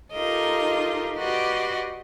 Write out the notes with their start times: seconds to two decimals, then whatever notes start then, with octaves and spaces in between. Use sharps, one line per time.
0.13 D#4 F4 G4 A4 A#4 D#5
1.17 F#4 G4 B4 D5 D#5 C6